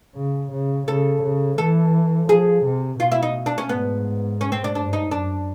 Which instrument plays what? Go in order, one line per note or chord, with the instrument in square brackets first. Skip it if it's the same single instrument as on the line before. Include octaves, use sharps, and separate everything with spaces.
[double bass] C#3
C#3
[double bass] C#3 [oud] A4
[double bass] C#3
[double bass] E3 [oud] A4
[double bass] F3 [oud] G#4
[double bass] C3
[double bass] B2 [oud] F4
[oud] E4
D#4
D4
C#4
[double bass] G#2 [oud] B3
[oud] C#4
C4
D4
[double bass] G2 [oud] D4
[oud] D#4
[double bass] F#2 [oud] D4